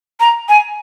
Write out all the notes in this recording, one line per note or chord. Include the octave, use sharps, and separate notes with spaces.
A#5
G#5